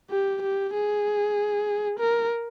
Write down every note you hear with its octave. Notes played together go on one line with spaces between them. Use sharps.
G4
G4
G#4
A#4